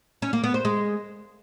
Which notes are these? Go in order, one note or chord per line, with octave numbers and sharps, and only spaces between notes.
C#4
A#3
B3
C5
G#3